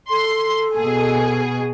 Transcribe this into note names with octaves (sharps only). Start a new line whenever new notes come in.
A4 C6
B2 G#4